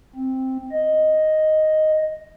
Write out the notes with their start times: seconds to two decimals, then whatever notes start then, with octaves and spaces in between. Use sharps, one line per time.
0.16 C4
0.71 D#5